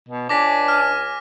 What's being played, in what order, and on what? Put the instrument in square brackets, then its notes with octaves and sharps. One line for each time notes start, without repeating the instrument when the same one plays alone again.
[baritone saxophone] B2
[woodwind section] C#2 G#5 [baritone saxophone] D4 [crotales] D6 A#6 B6
[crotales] F6